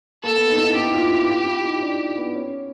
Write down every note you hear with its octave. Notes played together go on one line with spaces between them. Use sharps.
A#3 A4
B3
D#4
E4
D#4
E4 G4
F4
E4
F4
E4
D#4
D4
B3
C#4